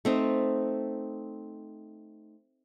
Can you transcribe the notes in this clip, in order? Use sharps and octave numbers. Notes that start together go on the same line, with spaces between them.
A3 C4 D#4